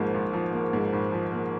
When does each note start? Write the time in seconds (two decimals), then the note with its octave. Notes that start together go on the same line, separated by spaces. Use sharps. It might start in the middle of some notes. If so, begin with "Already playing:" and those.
Already playing: G#1 G#2 F3 A#3
0.14 G#1
0.33 F3
0.53 A#3
0.73 G#2
0.93 G#1
1.12 F3
1.32 A#3